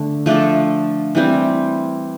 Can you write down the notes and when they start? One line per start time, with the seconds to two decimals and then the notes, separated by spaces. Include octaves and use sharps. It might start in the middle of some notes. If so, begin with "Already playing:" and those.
Already playing: D3 A3
0.26 F3 A3 D4 A4
1.15 E3 G3 C4